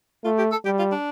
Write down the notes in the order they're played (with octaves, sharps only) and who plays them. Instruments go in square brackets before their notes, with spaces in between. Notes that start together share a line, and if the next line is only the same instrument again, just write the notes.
[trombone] A3 [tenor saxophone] F4
[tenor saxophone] G4
A4
[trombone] G3 [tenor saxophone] G4
[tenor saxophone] F4
D4